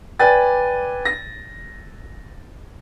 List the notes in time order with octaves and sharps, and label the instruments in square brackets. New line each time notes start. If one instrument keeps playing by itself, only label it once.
[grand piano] B4 D5 G5 G#5 A6
A#6